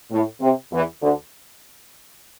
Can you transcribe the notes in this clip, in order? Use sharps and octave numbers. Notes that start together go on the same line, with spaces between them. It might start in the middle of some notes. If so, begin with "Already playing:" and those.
A2
C3
E2 E3
D2 D3